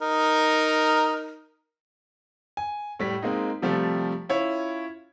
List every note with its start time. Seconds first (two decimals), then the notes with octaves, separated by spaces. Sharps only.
0.02 D#4 A#4
2.57 G#5
2.99 A2 G3 B6
3.22 G#3 A#3 C4 D#4
3.62 C3 F3 G3 A3
4.29 C#4 E4 F4 C#5